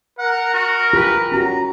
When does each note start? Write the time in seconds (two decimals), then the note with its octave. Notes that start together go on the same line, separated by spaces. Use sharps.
0.19 A#4 F#5
0.54 F#4
0.93 F4 G4 G#4 B4
1.32 C#4 F#4 G4 A#5